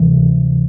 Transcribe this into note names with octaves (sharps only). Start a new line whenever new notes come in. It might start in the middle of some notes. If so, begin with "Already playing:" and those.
Already playing: D2 C3 E3